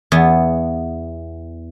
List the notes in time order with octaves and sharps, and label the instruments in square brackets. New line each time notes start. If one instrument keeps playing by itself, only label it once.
[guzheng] E2 B3